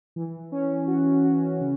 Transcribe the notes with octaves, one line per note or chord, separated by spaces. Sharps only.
E3
C#4
F#4
F#4
C#3